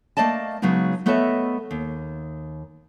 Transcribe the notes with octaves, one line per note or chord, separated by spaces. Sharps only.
A3 A#3 D5 D#5 A5
C#3 F#3 G#3 B3 D#4
A3 B3 A4 C#5 D#5 E5
D#2